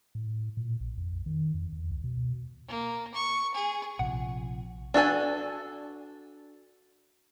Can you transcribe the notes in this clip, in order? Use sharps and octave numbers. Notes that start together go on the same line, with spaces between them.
A2
A#2
A#1
F2
D#3
F2
E2
C#2
B2
A#3
C#6
G#4
A#1 C3 F3 F#5
D4 F#4 A4 G#5